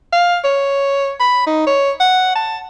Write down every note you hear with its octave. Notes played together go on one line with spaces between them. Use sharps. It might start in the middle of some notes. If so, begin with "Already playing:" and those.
F5
C#5
B5
D#4
C#5
F#5
A5